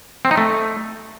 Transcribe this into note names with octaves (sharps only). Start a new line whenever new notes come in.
C4
D#4
A3